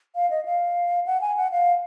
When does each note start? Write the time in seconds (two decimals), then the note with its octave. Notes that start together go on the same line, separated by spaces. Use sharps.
0.15 F5
0.30 D#5
0.45 F5
1.06 F#5
1.21 G#5
1.37 F#5
1.51 F5